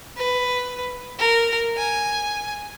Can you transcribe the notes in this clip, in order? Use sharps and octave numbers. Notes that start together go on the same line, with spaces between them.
B4
A#4
G#5